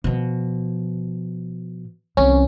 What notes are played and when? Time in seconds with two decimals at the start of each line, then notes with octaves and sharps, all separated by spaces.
0.04 B2 F3
2.17 C2 E3 C#4